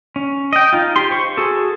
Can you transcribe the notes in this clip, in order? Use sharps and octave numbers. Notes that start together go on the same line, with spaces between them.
C#4
D#5 G5
D#4 F4
G4 C6
C5 C#6
F#4 G#4 A4